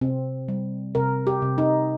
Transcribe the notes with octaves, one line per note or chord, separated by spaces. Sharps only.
C3 C4
G3
C3 A#4
G4
C3
D#4